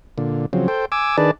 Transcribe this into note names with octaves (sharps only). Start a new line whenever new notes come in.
A#2 D3
C#3 F3 F#3 C4
A4 C5 G5
G#5 D6 E6
D#3 D4 G#4 B4 D5 A5